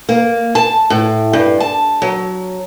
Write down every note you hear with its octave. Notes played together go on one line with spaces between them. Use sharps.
A#3
A5
A2
G2
A5
F#3